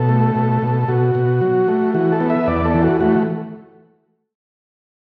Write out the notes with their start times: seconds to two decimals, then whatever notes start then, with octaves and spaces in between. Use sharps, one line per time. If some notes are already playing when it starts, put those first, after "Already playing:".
Already playing: B2 A4
0.09 A3
0.35 B2
0.62 B2
0.88 B2 F#4
1.15 B2
1.41 F#3
1.68 A3
1.94 E3 F#4
2.12 A4
2.20 B3
2.30 E5
2.48 E2 D5
2.65 A4
2.74 E3
2.83 F#4
3.01 A3 F#4